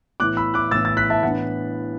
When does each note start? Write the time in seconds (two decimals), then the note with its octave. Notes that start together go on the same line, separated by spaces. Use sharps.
0.20 A2 E3 B3 D6 F#6
0.37 B5 E6
0.54 D6 F#6
0.71 A2 E3 B3 E6 A6
0.85 E6 A6
0.97 F#6 B6
1.10 E5 A5
1.23 A2 E3 B3 D4 F#5